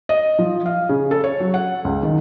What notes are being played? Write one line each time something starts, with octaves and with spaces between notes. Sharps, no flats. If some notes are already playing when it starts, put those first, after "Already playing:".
D#5
F3
F5
C#3
A4
C#5
F#3
F#5
C#2
D#3